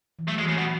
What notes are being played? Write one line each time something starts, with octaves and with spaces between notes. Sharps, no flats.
E3
F#3 A3
G#3
C#3 E3
B2